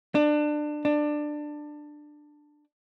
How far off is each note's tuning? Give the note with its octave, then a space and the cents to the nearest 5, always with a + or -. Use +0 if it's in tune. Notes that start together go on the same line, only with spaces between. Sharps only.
D4 +25
D4 +15